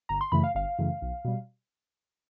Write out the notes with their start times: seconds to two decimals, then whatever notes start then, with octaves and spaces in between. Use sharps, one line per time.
0.09 G1 A#5
0.21 C6
0.32 F#2 C#3 E3 A3 B5
0.44 F5
0.55 G1 F5
0.79 F#2 C#3 E3 A3
1.02 B1
1.25 B2 G3